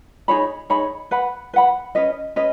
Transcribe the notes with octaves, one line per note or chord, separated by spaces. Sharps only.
D#4 G#4 C#5 B5
D#4 G#4 C#5 B5
B4 F#5 B5
B4 F#5 B5
C#4 B4 D#5
C#4 B4 D#5